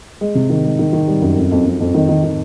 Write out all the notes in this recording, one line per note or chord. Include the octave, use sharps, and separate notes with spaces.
G#3
C3
D#3
G#3
D#3
D#3
G3
F#2
F2
F2
F2
F2
D#3
D#3
D#3